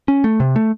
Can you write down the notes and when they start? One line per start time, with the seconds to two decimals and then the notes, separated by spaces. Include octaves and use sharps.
0.08 C#4
0.24 A3
0.40 C3
0.56 A3